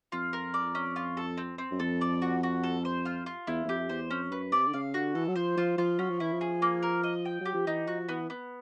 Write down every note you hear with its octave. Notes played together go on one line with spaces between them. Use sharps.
F2 F4
A#4
D5
C#4
F4
A4
C4
C4
F#2
F2 A4
D5
F#4
F#4
A4
C5
F4
F4
E2 E4
E2
F2 G4
E2 C5
F2 C#4
F#2 B4
C3 D5
D3
C#3 F5
D3 F#4
E3 A4
F#3
F3 C5
F3 F4
F3 F4
F#3 C#4
F3
E3 E4
F3
G#4
A#3
A#4
D#5
G5
F#3 G4
F3
E3 D#4
F3 F#4
E3 B3
B3